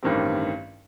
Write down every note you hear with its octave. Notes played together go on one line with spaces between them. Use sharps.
A1 G2 D#3 G3 C4